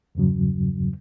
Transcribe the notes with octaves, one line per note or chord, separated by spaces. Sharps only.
E2 G2 C#3 F#3